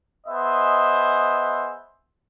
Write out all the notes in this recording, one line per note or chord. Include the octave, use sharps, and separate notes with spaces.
B3 G#4 C5 D#5 E5